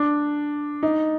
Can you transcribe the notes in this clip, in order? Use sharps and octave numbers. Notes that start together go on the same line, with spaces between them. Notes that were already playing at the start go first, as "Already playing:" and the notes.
Already playing: D4
D#4